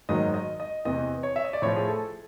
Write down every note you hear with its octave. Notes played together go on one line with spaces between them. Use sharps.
G#2 D#3 F#3 D#5
D#5
D#5
E2 C3 E3 D#5
C#5
E5
D#5
D5
A2 F3 C#5
G#4
A4